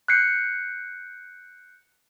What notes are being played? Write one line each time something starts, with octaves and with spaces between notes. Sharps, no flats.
F#6 G6 C7 C#7